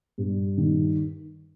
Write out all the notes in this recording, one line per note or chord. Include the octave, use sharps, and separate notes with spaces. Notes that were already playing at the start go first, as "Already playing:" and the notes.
G2
D#3